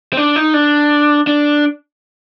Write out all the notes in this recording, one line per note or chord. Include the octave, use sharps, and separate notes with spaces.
C4
D4
D#4
D4
D4